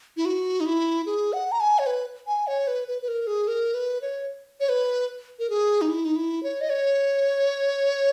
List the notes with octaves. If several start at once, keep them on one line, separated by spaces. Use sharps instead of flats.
E4
F#4
D#4
E4
G#4
F#5
A#5
G#5
C#5
B4
G#5
C#5
B4
B4
B4
A#4
G#4
A#4
B4
C#5
C#5
B4
A#4
G#4
D#4
E4
D#4
E4
C#5
D#5
C#5